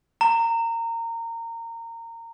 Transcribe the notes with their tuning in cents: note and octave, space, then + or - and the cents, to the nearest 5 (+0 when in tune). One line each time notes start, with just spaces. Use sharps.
A#5 -20